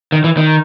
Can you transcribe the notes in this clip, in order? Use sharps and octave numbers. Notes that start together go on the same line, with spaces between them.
D#3
E3
D#3